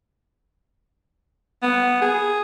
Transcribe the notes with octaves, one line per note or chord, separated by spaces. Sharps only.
B3
G#4